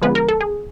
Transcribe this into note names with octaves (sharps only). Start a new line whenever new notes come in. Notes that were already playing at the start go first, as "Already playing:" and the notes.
D3 F3 G#3 B3 B4
A#4
A4
G#4